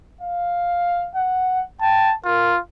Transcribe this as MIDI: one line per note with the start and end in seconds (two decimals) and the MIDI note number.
0.21 1.10 77
1.15 1.60 78
1.81 2.09 79
1.81 2.15 81
2.25 2.59 65
2.25 2.53 70